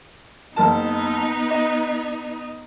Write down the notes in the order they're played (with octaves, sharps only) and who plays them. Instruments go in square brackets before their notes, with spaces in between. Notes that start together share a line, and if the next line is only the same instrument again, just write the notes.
[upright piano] F#1 A#4 A5 [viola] B3 D#4
[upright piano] D#5